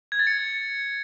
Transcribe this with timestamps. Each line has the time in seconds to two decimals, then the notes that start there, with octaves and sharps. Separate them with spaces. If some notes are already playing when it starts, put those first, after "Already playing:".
0.12 G#6
0.19 A6
0.27 C#7